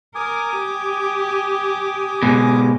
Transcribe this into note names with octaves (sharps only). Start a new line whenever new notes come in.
A#4 G#5 D6 D#6
G4
G#2 B2